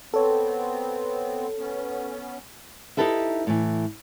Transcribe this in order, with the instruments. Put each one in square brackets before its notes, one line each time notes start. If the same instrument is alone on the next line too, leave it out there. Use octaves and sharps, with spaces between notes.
[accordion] B3 C4 [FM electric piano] A4 C#5
[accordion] B3 C#4
[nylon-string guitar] D#4 E4 G4 A4 B4 E5
A2 E3